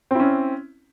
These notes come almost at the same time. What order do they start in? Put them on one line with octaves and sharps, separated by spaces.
C4 E4 C#4